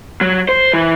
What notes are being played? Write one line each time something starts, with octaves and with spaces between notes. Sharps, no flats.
F#3
C5
E3